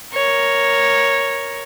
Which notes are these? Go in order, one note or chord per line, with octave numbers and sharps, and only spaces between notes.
A#4 C#5